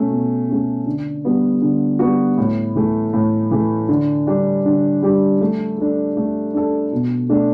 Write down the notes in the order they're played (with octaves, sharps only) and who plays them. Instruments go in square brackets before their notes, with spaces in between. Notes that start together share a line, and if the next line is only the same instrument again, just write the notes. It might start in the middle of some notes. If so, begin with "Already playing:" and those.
Already playing: [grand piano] B2 A3 C#4
B2
A3 C#4
D3
G3 B3 F#4
D3
G3 B3 F#4
A2
E3 A3
A2
E3 A3
D3
G3 D4 G4
D3
G3 D4 G4
A3
D4 A4
A3
D4 A4
B2
A3 D4